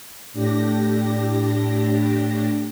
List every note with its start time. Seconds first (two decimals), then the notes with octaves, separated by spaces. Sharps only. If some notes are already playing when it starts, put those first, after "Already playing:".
0.33 A2 D4 G4 A#6